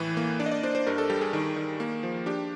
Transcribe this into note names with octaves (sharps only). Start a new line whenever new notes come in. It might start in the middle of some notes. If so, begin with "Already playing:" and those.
Already playing: A2 E3
A#3
D4 D5
D#5
D5
D4 C5
C5
G2 A#4
A4
G3 G4
G#4
D#3
D#3
A#3
F3
D4 G4